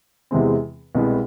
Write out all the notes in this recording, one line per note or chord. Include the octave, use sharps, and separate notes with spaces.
E2 C3 E3 G#3 C4
C2 B2 G#3 B3 E4